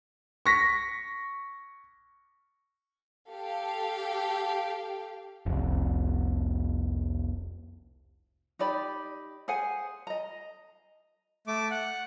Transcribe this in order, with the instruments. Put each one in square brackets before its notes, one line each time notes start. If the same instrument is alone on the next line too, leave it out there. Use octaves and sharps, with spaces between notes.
[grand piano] C#6 A#6 B6
[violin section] G4 A4 F5
[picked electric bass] F1 C2
[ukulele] D#4 G4 D5 B5
G#4 C5 F#5 G#5
D#5 A#5
[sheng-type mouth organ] A3 D6
F#5